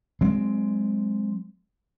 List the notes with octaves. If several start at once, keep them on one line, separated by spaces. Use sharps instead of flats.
F#3 G#3 C4